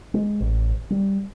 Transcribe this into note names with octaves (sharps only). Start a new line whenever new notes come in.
G#3
A1
G3